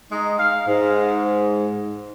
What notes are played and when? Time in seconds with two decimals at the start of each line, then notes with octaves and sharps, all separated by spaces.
0.10 G#3 D#4
0.38 F5
0.66 G#2